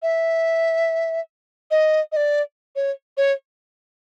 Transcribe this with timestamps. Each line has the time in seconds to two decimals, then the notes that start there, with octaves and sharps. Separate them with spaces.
0.03 E5
1.71 D#5
2.12 D#5
2.16 D5
2.76 C#5
3.17 C#5